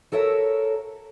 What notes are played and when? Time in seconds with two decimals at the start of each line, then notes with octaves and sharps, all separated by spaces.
0.12 F#4 A4 A#4 C#5 E5